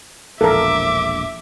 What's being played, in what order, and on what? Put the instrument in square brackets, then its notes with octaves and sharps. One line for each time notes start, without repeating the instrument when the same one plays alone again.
[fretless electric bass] E1 A#1 A#3 [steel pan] A4 A#4 [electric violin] E5 D6